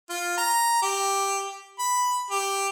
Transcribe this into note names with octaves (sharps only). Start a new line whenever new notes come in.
F4
A#5
G4
B5
G4